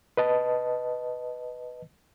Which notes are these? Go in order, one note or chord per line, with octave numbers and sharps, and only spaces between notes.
B4 D#5 A5